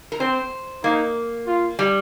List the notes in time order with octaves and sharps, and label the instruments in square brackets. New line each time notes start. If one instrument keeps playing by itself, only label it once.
[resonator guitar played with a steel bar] A#4
[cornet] C4 [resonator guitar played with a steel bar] C5
[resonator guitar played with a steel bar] A#3 [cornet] D#4
[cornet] F4
[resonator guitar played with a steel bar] G3